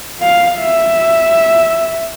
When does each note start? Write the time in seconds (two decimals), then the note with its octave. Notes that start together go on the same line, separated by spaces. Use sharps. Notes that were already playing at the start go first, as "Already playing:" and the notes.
0.21 F5
0.59 E5